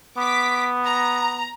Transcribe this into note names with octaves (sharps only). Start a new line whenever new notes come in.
B3 D6 B6
A#5